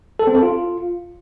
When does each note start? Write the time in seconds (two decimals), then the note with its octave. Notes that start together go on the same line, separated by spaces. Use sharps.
0.19 A4
0.27 C4
0.35 A4
0.43 F4